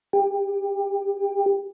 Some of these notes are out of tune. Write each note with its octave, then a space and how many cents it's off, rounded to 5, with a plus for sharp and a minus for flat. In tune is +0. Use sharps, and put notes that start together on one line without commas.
G4 +25